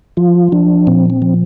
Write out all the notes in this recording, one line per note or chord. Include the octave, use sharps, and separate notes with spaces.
F3 F4
F3 D4
A#2 C4
C4
F3